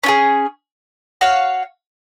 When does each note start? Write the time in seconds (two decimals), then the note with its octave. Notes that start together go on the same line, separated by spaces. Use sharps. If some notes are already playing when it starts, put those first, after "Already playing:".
0.04 C#4 F4 G#4
1.21 F#4 C#5 F5